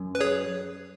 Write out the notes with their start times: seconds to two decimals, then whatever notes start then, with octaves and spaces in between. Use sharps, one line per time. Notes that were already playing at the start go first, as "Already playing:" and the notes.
Already playing: F#2
0.15 B4
0.21 G#4 C#5